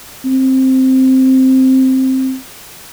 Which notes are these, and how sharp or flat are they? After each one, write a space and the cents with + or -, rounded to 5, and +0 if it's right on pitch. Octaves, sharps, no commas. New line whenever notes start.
C4 +0